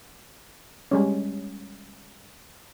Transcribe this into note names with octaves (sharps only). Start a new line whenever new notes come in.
G3 G#3 C#4